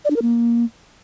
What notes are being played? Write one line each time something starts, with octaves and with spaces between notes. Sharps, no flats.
D5
D4
A#4
A#3